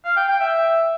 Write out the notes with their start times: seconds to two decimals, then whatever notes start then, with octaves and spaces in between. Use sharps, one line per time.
0.05 F5
0.16 G5
0.28 G5
0.40 E5